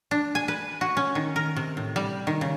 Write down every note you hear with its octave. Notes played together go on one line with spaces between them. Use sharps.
D4
G#5
B4
F#4
C#4
D#3
A#4
C3
A2
G3
D#3
C#3